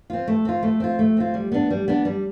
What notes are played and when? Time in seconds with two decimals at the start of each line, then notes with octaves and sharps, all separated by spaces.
0.10 C4 F4
0.28 A3
0.45 C4 F4
0.63 A3
0.80 C4 F4
0.99 A3
1.17 C4 F4
1.34 G3
1.52 B3 D4
1.70 G3
1.88 B3 D4
2.05 G3